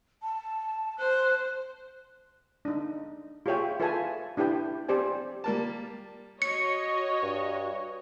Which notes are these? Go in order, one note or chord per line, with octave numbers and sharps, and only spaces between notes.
A5
C5 F#6
D4 D#4
F4 G4 G#4 C#5 E5 G5
F4 A4 B4 E5 G#5 A5
D4 E4 G4 B4 G5
C4 G4 C5 D5 G#5
G3 A#3 A5
F#4 C#5 D#5 C#7
G2